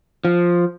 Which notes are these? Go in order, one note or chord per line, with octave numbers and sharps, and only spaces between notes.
F3